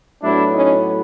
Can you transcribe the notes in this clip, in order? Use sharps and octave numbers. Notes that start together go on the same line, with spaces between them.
A2 F#3 B3 D4 E4
C#4 D#4